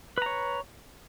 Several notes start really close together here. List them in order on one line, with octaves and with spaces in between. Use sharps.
B4 A#5 C#5